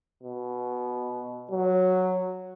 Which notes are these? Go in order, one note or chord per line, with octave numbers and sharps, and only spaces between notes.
B2
F#3